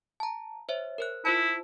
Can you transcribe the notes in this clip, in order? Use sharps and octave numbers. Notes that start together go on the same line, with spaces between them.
A5 A#5
C5 C#5 E5
A#4 C5 F#6
E4 F4 C5 A5